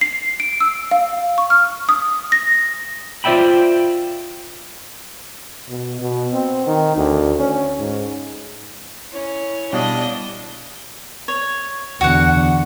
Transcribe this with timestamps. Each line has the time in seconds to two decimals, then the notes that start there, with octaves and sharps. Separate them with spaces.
0.01 C7
0.40 D7
0.61 E6
0.91 F5
1.38 C#6
1.50 F6
1.89 D#6
2.32 A#6
3.24 F4 C5 D5 E5 G5 B5
5.69 B2
6.01 B2
6.33 C4
6.66 D#3
6.97 D2
7.39 C#4
7.78 G#2
9.12 C#4 E4
9.73 B2 G3 D4 D#5 F5
11.28 C#5
12.01 E2 D3 F#4 F#5